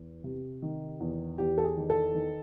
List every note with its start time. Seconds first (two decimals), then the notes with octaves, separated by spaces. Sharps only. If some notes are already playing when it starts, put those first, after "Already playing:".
Already playing: E2
0.24 C3
0.62 D#3
1.00 E2
1.38 E2 G4
1.58 A4
1.64 G#4
1.77 D#3
1.90 A4
2.15 D#3